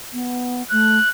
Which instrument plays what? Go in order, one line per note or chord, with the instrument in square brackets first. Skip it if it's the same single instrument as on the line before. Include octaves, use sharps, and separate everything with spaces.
[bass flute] B3
[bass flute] A3 [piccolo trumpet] F#6